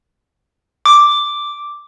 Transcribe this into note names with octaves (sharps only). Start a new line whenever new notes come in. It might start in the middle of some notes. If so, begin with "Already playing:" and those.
D6